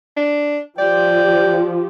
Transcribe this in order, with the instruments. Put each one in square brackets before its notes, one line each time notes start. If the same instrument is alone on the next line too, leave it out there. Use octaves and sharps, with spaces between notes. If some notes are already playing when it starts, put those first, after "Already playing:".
[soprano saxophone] D4
[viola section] F3 G4 [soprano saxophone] D5 [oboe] G5